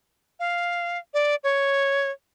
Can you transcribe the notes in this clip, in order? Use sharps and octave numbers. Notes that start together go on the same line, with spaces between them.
F5
D5
C#5